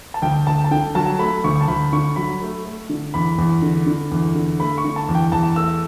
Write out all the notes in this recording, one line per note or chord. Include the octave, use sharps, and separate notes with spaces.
A5
D2 G5
D2 A5
A5
D3 G5
F#3 A5
A3 B5
D2 C#6
A5
D2 B5
D3 C#6
F#3 B5
A3
A3
D3
E2 B5
E2
D3
D3
E2
D3
A3 B5
C#6
D3
A5
E2
G5
E2 A5
A3 E6